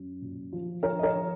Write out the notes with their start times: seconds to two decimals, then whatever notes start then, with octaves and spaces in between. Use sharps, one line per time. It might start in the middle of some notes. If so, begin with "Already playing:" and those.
Already playing: F#2
0.21 A#2
0.52 F3
0.83 F3 A#4 C#5
0.99 D#5
1.03 A#4 C#5
1.14 F3